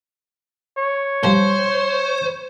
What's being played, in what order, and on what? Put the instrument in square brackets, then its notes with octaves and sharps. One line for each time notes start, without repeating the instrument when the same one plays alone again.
[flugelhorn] C#5
[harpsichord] F3 G3 [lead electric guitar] C5